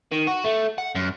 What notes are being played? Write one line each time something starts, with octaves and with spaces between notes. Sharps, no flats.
D#3
F#4
A3
F#5
F#2